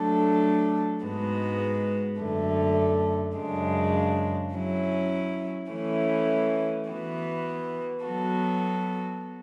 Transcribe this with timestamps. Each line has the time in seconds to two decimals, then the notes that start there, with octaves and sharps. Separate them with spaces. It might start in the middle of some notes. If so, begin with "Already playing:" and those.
Already playing: F#3 A3 D4 A4
1.03 G#2 G#3 B3 F#4
2.20 F#2 D3 A3
3.37 F#2 C#3 G#3 D4
4.54 F#3 C#4 E4
5.71 E3 A3 C#4 E4
6.88 E3 B3 F#4
8.06 F#3 B3 F#4 A4